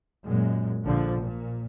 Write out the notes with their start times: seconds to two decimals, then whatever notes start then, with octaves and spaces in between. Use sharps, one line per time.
0.24 F#2 A#2 G#3
0.84 A#1 D3 F3
1.20 A#2